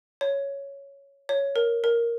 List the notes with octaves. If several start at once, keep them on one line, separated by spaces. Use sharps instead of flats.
C#5
C#5
A#4
A#4